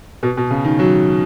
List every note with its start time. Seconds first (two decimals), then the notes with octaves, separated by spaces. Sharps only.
0.23 B2
0.37 B2
0.50 C#3
0.64 D#3
0.79 F#3